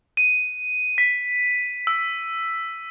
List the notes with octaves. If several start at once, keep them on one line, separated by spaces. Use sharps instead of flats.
D#7
B6
E6